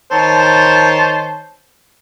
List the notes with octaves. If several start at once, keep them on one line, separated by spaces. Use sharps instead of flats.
D#3 C5 C#5 A5